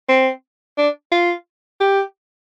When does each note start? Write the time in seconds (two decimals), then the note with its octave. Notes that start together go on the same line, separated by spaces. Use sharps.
0.09 C4
0.78 D4
1.12 F4
1.80 G4